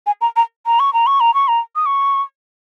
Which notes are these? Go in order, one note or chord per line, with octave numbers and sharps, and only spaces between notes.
G#5
A#5
A#5
A#5
C#6
A#5
C#6
A#5
C#6
A#5
D#6
C#6